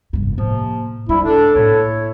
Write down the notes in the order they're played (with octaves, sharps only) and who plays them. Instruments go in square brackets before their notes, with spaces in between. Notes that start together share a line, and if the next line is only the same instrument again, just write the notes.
[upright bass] F1 G2
[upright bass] A2 A#3 [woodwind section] C3 F3
[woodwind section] D2 F3 G3 [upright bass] D4 [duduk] E4
[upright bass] G#2 [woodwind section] D4 [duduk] A4
[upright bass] A2 A#3 [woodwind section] E4 C#5